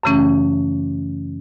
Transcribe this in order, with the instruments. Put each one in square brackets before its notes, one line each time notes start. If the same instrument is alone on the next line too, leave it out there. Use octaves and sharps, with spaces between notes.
[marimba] F#2 C#3 E3 A3 C#4